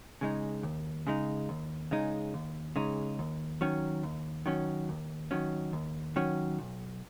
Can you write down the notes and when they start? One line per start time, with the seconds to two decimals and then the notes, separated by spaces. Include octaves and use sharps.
0.21 C#3 G#3 D#4
0.63 D#2
1.07 C#3 G#3 D#4
1.49 D#2
1.91 C#3 G#3 D#4
2.34 D#2
2.76 C#3 G#3 D#4
3.19 D#2
3.61 D#3 F#3 C#4
4.03 D#2
4.46 D#3 F#3 C#4
4.89 D#2
5.31 D#3 F#3 C#4
5.73 D#2
6.16 D#3 F#3 C#4
6.59 B1